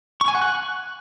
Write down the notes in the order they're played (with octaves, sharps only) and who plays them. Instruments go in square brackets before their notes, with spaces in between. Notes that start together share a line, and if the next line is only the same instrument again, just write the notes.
[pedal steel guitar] C#6
G#5
F#5
F#6